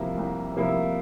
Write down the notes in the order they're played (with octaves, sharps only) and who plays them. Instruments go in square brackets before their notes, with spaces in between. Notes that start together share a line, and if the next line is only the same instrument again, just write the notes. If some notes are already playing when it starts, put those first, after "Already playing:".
Already playing: [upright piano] C2 C3 F3 A#3 E4
C2
C3 F3 A#3 E4